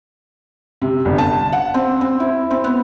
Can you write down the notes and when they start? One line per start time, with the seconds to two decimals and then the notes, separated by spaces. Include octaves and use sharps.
0.82 C3
1.05 G1
1.18 A5
1.52 F#5
1.74 C4
2.01 C4
2.20 E4
2.51 C4
2.64 B3